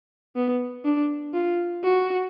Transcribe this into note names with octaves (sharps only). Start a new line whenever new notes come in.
B3
D4
F4
F#4